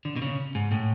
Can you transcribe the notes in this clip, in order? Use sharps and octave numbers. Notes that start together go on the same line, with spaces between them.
D3
B2
C#3
G#2
A2